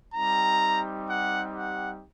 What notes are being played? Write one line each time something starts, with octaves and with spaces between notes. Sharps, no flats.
G3 C4 D#4 G4 A#5
F#5
F#5